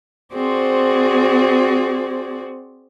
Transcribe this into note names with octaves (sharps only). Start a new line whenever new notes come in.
C4 F#4 G#4 C5 D5